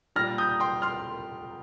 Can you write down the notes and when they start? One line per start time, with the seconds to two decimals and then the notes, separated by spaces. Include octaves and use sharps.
0.16 A#2 G3 F6 A#6
0.38 D#6 G6
0.60 G5 C6
0.82 C6 F6